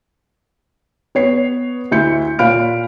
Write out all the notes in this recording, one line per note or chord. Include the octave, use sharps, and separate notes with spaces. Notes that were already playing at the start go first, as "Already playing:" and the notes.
B3 C#5 C7
D2 E4 G6 C#7
A#2 C#5 F5 B5 F6 D7